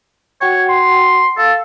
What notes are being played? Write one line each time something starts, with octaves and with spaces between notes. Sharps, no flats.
F#4 C#5 F#5 G5
C6
A4 F5